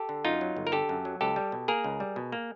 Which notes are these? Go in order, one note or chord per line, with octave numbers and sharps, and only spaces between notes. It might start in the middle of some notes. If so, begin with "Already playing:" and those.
Already playing: G4 A4
D3
F#2 D#4 F4
F#3
G1
A#4
D3 G4 A4
F#2
F#3
C#2 G4 A4
G3
B2
A#3 G#4 A#4
C#2
G3
B2
A#3